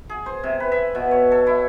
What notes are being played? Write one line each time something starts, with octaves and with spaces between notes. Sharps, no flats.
G#4
C5
C3
B4
E5
B2
C#5
A4
E4